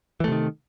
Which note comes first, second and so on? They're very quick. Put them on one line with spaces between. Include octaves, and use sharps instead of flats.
E3 A3 C3 D#3